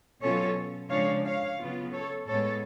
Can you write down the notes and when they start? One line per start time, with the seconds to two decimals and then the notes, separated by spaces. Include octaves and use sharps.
0.21 B2 F#3 C#4 F4 A4 C#5
0.90 C#3 F3 G#3 D4 C#5 F5
1.25 C#5 F5
1.60 C#3 F#3 B3 F4
1.94 A4 C#5
2.27 A2 G#3 B3 A4 C#5